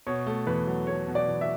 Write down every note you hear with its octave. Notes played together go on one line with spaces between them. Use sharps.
B2 C#5
A3
E2 B4
F#3
A3 C#5
B2
D5
E2
E5